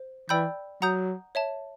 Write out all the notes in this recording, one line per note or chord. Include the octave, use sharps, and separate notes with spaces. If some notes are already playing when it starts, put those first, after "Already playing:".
Already playing: C5
E3 D5 G5 B5 E6 G6
F#3 F#5 A#5 D#6 G6
C#5 E5 A5